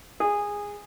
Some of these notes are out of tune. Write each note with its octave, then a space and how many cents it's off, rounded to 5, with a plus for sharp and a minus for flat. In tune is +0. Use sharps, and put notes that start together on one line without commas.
G#4 -15